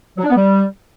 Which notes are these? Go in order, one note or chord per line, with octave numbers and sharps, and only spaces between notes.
F#3
D4
B3
G3